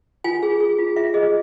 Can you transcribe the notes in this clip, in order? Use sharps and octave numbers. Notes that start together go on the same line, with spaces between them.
F4 G#5
G#4
G#4
F4
F4 E5
G#4 D#5